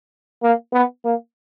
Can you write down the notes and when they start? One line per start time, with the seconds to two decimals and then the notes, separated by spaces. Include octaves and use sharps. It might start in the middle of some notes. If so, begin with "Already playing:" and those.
0.43 A#3
0.73 B3
1.05 A#3